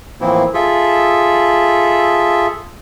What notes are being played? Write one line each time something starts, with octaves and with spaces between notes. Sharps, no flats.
A2 E3 F3 A#3 C4 E4
F4 G#4 A4 E5